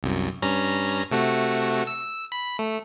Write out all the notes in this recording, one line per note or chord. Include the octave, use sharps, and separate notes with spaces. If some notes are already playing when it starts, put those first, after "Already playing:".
C2 F#2
G2 C#4 A#5
C3 A3 F#4
E6
B5
A3